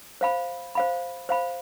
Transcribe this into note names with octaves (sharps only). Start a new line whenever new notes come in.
C5 F5 B5
C5 F5 B5
C5 F5 B5